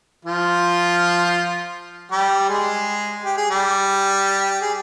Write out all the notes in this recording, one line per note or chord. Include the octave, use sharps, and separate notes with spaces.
F3 F4
G3 G4
G#3 G#4
G4
G#4
G3 G4
G#4